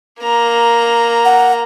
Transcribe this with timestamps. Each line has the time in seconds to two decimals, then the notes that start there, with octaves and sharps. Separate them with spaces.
0.20 A#3 A#5
1.25 F#5